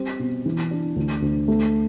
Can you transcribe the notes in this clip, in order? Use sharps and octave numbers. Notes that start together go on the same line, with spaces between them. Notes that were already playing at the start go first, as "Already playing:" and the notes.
Already playing: G3 C4
B2
E3
D4
D2
D2
A3